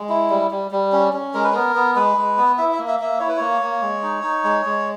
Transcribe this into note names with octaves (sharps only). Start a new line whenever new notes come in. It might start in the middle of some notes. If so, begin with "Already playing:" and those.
Already playing: G#3
E4
G3
G3
G3
C#4
C#4
G#3 A#4
B4
B3 A#4
B3
G#3 B4
G#3
B3
E4 E5
E5
A#3
E5
A#3 E5
E4 C#5
B4
A#3 C#5
A#3
G#3
D#4
D#4
G#3
G#3